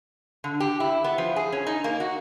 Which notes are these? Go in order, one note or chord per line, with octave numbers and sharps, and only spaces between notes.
D3
G4
E4
B3
F3
G#4
C#4
D#4
A#3
F#4